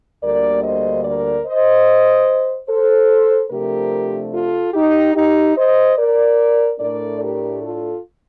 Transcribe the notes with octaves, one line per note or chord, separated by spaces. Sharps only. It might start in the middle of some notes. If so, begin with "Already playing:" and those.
D2 D3 G3 A#3 A#4 D5
C5 D#5
A#4 D5
C5 D#5
A4 C5
C3 F3 A3 D4 G4 A#4
F4 A4
D#4 G4
D#4 G4
C5 D#5
A#4 D5
A2 A3 D4 A#4 D5
G4 A#4
F4 A4